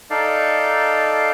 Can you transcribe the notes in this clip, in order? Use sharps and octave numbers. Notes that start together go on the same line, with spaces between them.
D#4 A4 D5 F5